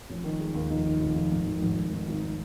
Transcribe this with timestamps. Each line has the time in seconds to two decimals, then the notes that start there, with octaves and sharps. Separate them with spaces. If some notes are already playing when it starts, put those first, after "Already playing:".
0.10 F1 C#4
0.24 D#3
0.40 G#3
0.54 D#2
0.70 F1 D#4
0.86 D#3
1.00 F1
1.16 F1
1.32 G#2
1.46 G#1
1.62 G#1
1.77 G#1
1.92 G#2
2.08 G#1